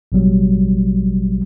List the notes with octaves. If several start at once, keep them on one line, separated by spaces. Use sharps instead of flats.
A1 B2 F#3 G3